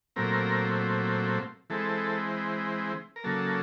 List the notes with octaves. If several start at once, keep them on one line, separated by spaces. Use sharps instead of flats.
A#2 F#3 A3 C4 A#4
E3 G#3 C4 A4
A#4
C#3 F#3 A#3 A4